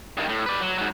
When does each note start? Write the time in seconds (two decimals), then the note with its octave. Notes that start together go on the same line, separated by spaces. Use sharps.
0.17 G2 D#3
0.29 A2
0.46 B4 D5
0.60 F#3
0.78 G#2 F#3